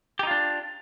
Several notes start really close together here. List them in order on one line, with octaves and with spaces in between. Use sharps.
G4 D#4 F4 D4